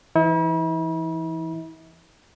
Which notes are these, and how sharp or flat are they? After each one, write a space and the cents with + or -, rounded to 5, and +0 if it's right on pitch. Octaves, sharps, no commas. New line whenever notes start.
E3 +20 E4 -40